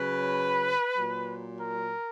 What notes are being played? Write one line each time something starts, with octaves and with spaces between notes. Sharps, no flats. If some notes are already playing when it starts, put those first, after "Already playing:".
Already playing: C#3 F#3 B4
A#2 F#3
A#4